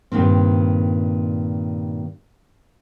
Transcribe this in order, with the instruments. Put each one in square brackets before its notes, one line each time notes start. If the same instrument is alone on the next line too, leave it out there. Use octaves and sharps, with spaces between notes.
[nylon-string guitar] G2 A#2 D#3 C4